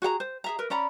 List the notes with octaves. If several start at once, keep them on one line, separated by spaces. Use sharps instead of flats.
F#4 G#4 F#5 A#5
C5
G#4 E5 A#5
A#4 B4
C#4 D5 A#5 B5